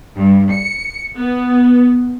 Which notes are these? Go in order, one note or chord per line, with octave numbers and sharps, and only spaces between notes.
G2
C#7
B3